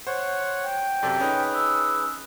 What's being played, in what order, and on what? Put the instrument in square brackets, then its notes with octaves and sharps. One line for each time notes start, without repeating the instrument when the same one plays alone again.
[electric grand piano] C5 [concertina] C#5 F#5
[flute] G5
[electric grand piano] F#2 C3 [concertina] A4 D5
[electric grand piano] C#4 D#4 [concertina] G#4 B4
[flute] E6